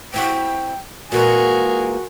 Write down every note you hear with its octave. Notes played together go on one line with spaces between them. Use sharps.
C4 E4 F#4 G5
A#2 E3 G#3 F#4 G#4 A#4